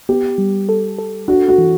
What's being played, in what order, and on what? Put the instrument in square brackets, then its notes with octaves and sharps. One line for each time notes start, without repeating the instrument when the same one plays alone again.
[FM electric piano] B3 [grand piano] G4
[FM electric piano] G3
A4
A4
[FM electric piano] D4 [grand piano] F#4
[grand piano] F#4
[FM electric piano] E3